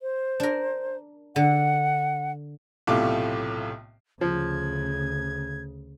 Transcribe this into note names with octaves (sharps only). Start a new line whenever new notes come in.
C5
D4 A#4
D3 F#5
B1 A2 C3 A3 F4 D6
D2 C#3 F3 G#6